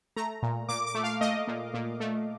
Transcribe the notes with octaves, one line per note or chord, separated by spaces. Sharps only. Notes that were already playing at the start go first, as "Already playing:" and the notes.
A3 A#5
A#2
A#2 D6
D6
A3
F5
A3 D#5
A#2
A#2
A3